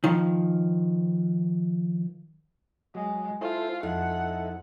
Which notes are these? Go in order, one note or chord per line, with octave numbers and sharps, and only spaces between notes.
D#3 F3
F#3 G#3
E4 F4 A4 C5
F2 D#4 E4 A4 F#5